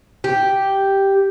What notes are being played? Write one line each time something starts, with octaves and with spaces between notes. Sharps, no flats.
G4